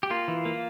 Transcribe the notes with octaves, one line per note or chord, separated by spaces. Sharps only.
G4
A#3 F4
E3
A#3